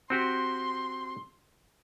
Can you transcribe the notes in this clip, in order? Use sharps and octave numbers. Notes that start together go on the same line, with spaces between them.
C4 F#4 G4 C6